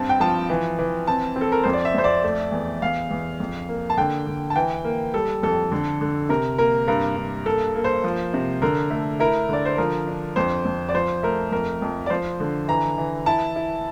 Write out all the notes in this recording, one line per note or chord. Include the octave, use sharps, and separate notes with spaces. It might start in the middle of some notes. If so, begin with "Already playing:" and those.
Already playing: G2 C4 A5
G5
F3 A5
E3
E3
C4 A5
C4
A4
A#4
F2 C5
D5
E5
F2 C5
D5
A3
E2
E2 F5
E2
F2
A#3
A5
D3 G5
D3
A5
E3 G5
A#3
G3 A4
F2 A4
D3
D3
C3 A#4
A#3 A#4
G2 A#4
G2
A#3 A4
A#3
C5
F3
C3
D3 A#4
A3
E4 A#4
D3 D5
C5
F3 A#4
D4
F2 C5
F2
D5
F3 C5
A3 A#4
F2 A#4
F2
D5
F3 C5
D3
E3 A#5
E3
E4 A5
E4